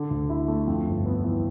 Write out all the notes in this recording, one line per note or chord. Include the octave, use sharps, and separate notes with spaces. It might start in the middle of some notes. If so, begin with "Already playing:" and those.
Already playing: D3
D2
E4
A3
F2
G1
B3
E3